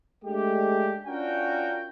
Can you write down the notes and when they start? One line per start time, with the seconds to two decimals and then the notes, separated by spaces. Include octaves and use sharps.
0.24 G#3 A3 D4 G4
1.07 C#4 D4 F4 F#4 A#4 G5